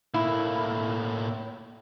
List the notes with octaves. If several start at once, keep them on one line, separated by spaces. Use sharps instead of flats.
A2 A#3 E4